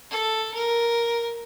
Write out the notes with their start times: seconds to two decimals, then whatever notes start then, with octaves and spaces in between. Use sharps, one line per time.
0.11 A4
0.54 A#4